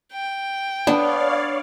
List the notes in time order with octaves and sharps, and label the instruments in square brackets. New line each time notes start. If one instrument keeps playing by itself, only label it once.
[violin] G5
[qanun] B3 [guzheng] D4 [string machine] C#5 D5 F5